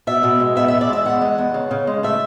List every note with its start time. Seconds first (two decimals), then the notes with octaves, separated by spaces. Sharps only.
0.07 B2 E5
0.23 B2
0.40 G#3
0.56 B3 E5
0.68 E2 E5
0.81 D5
0.89 G#3 E5
1.05 E2 F#5
1.22 G#3
1.38 E2
1.54 C#3
1.71 C#3
1.87 G#3
2.03 A3 E5